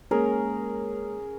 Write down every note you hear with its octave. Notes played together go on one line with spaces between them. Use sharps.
G#3 A#3 C#4 G#4 A#4